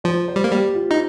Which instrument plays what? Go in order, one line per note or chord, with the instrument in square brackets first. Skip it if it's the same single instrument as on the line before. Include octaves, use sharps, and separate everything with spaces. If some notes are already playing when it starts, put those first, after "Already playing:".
[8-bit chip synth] F3 [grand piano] C5
[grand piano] C5
[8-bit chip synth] G3
A#3
[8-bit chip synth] G3 [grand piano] G4
[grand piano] F4
[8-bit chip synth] D#4